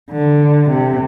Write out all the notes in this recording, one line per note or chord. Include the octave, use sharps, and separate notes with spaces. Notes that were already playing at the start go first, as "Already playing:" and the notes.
D3
C3